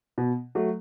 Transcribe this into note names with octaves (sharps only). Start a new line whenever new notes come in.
B2
F#3 A3